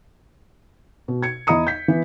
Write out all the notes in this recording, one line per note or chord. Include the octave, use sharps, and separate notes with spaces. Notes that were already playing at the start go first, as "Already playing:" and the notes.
B2
G#6 C#7
E2 E4 D#5 A#5 D#6 C#7
G6 B6
E3 B3